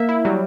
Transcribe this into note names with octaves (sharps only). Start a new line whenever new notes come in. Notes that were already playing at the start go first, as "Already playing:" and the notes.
Already playing: A#3 E5
E4
F#3 G3